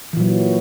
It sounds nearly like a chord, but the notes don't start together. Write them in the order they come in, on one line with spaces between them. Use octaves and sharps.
E3 A#2 F#3